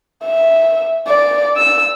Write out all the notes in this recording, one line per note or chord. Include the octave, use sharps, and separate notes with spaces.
E5
D5
E6